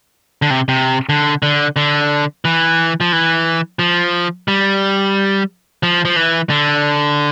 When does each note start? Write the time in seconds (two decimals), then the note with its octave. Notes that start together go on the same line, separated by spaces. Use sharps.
0.42 D3
0.50 C3
0.68 C3
1.09 D3
1.43 D3
1.76 D3
2.45 E3
3.00 F3
3.13 E3
3.79 F3
4.48 G3
5.83 F3
6.05 F3
6.16 E3
6.50 D3